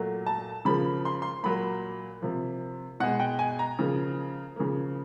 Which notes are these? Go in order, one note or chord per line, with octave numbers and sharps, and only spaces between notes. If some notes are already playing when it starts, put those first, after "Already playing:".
Already playing: A#2 F#3 A3
A5
C#3 F3 A#3 B5
C6
C6
A#2 F#3 A#3 B5
C3 F3 A#3
B2 G#3 F#5
G5
G#5
A#5
C#3 F3 A#3
C#3 F3 A#3